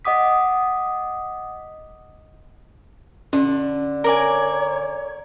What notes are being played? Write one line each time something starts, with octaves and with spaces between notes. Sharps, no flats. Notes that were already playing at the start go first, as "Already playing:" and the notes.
D#5 F#5 D6 D#6 B6
D3 C#4
A#4 C#5 D5 G#5